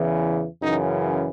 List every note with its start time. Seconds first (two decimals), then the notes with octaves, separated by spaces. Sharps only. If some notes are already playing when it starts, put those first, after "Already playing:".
Already playing: E2 C#3 E3
0.61 F#2 C#3 E3 D#4